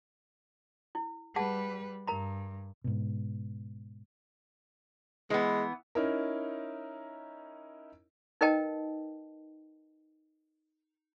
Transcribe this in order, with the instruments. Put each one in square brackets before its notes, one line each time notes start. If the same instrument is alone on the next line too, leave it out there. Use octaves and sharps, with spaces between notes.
[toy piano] E4
[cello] G3 B4 [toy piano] G#4 F#5 A5
[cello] G2 [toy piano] A#4 A#5 B5
[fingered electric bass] G#2 B2
[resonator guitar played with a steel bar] E3 B3 [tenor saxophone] G#3
[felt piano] C#4 D#4 E4 A#4
[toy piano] D#4 A#4 B4 D#5 G5 A5